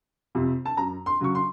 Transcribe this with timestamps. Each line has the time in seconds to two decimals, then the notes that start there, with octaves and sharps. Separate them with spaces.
0.35 F2 C3
0.65 A5
0.77 F#2 A#5
1.06 C6
1.20 C#3 F#3 C#6
1.35 C6